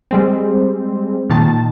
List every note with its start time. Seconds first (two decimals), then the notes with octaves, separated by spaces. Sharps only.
0.11 G3 G#3 C4
1.30 A#2 D#3 A5